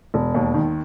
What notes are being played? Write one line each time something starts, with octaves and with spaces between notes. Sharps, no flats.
E1
D#2
D#3